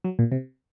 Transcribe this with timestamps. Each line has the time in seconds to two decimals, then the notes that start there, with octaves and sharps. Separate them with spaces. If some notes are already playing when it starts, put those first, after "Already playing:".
0.04 F#3
0.19 A#2
0.32 C3